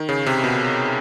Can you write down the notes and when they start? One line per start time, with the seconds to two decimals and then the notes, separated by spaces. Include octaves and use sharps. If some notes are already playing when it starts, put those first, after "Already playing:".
Already playing: D#3
0.09 C#3
0.26 C3
0.44 B2